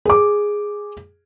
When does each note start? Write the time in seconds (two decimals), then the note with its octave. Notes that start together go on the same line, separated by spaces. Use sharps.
0.05 G#4 D6